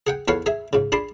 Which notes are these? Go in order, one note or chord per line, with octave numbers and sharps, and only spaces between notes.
G#4 F#5 G5
E2 A4 B4 C#5 F5 F#5
G#4 E5 G#5
G#2 C#3
D4 G#4 A5 B5 C6